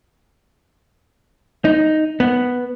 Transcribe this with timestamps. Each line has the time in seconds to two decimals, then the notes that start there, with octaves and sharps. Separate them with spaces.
1.65 D#4
2.20 B3